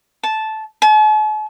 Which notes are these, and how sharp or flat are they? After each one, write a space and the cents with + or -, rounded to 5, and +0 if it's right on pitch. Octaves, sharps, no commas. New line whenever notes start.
A5 -10
A5 -45